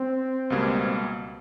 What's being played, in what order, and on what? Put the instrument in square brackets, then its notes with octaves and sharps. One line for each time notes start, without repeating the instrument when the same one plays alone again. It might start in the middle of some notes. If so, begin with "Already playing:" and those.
Already playing: [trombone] C4
[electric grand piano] C#2 B2 G3 A#3